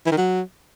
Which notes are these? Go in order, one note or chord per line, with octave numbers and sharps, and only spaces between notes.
E3
D#3
F#3